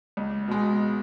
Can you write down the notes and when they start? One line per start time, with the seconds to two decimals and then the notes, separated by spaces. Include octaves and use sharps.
0.17 C#2
0.48 B2 G#3